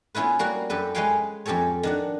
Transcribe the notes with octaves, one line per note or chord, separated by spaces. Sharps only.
B3 C#4 E4 F4 B4
G3 A#3 F#4 F#5
F#2 G4 A4 B4
G#3 G#4 B4 C#5 F5 G5
F2 C#4 G4 A4 C#5
D#3 D4 F#5